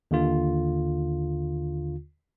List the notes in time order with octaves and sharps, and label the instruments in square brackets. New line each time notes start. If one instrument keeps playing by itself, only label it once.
[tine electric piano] D#2 D3 F4